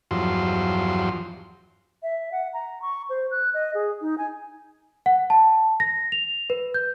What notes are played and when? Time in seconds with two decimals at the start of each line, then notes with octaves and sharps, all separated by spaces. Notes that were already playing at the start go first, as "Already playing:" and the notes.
0.11 E2 G2 F3 F#3 C6
2.02 E5
2.32 F#5
2.53 A#5
2.82 C#6
3.10 C5
3.31 F#6
3.54 D#5
3.75 G#4
4.01 D#4
4.18 G#5
5.06 F#5
5.30 A5
5.80 A#6
6.12 F7
6.50 B4
6.74 G6